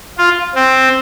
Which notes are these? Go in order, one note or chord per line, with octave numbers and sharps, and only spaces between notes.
F4
C4